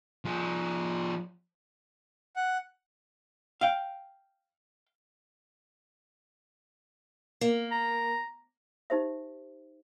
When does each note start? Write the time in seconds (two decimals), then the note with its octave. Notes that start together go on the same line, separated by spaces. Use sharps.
0.25 F3 G#4
2.36 F#5
3.61 F5 G5
7.41 A#3
7.71 A#5
8.90 D#4 G4 C5 E5